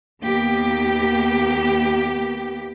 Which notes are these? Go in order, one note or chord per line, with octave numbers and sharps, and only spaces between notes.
D#2 A#3 B3 G4